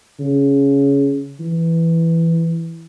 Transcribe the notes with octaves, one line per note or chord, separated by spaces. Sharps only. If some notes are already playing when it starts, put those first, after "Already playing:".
C#3
E3